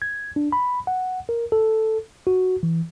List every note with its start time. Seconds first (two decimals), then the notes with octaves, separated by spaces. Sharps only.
0.02 G#6
0.36 D4
0.52 B5
0.87 F#5
1.29 A#4
1.52 A4
2.27 F#4
2.63 E3